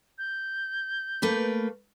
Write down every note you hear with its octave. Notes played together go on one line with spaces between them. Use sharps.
G6
A3 A#3 B4